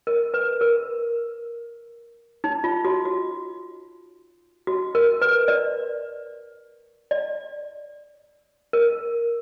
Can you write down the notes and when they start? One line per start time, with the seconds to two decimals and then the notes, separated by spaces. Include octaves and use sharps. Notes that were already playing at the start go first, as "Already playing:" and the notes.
0.07 A#4
0.34 B4
0.61 A#4
2.44 D#4
2.64 F4
2.85 F#4
3.05 F#4
4.67 F#4
4.95 A#4
5.22 B4
5.48 D5
7.11 D5
8.73 A#4